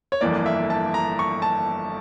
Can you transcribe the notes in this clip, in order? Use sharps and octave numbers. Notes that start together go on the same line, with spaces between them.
C#5
G1 F2 E3 A#3 D5
E5
A5
A#5
C#6
A5